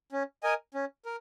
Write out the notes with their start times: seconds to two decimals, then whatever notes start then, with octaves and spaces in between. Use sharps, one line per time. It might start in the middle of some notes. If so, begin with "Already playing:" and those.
0.12 C#4
0.43 A#4 D#5 G#5
0.74 C#4
1.05 A#4